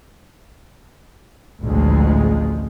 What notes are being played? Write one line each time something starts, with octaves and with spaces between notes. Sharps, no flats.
A1 D2 F3 G#3